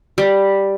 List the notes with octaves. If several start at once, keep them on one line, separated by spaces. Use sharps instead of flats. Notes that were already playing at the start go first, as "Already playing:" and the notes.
G3